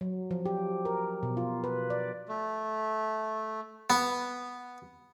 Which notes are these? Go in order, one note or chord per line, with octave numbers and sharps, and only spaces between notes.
F#3
F3
G4
A#4
B2
F4
B4
D5
A3
B3